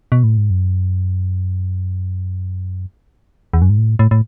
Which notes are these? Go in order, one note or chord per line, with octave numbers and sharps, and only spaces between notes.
B2
A2
G#2
F#2
E2
F#2
G#2
A2
A2
A2